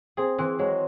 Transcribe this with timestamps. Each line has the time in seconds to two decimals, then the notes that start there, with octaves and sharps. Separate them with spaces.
0.17 C4 G#4
0.38 E3 C4
0.59 F#3 G#3